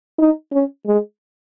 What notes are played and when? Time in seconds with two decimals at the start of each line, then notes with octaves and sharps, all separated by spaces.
0.19 D#4
0.52 C#4
0.86 G#3